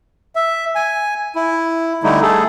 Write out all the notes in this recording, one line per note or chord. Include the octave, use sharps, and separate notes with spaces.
E5
G#5
E4
D3 G3 A3 D#4 E4
A3 G#4 A4